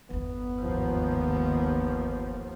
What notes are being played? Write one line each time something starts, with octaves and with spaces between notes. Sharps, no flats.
G1 E2 B3
D#2 G#2 F3